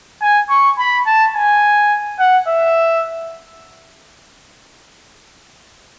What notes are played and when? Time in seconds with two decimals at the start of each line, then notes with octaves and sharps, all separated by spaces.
0.22 G#5
0.50 C#6
0.79 B5
1.06 A5
1.35 G#5
2.19 F#5
2.48 E5